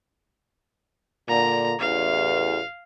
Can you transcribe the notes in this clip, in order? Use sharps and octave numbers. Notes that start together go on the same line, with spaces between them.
A#2 D3 A#5
A1 E2 F5